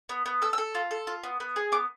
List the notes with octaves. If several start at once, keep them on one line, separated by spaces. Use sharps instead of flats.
B3
B3
A4 E6
E6
A4
F4
A4
F4
B3
B3
G#4
B3 D6